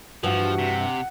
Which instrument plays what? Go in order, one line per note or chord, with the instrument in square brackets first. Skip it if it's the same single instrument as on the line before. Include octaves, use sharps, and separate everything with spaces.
[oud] G2 E3 [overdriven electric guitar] F3 [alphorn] F#4 [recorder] F#5
[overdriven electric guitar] C3